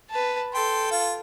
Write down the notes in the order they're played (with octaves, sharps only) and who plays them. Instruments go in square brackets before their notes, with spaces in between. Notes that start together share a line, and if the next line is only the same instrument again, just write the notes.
[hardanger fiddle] B4 A5
[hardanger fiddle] A4 [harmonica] G5 C6
[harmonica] F4